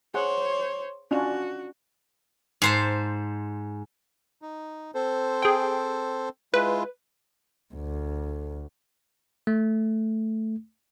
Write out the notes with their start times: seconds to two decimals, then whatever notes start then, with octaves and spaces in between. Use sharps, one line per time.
0.14 G#4 C5 C#5 F#5
1.11 C#4 D4 F4 F#4
2.62 G#2 C5 A5
4.42 D#4
4.94 C4 A4 C5
5.42 G#4 G5
6.54 G#3 E4 F4 B4
7.74 D2
9.47 A3